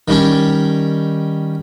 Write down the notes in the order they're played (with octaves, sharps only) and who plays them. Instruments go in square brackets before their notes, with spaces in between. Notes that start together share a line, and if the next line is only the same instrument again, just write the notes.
[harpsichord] D#3 G3 C#4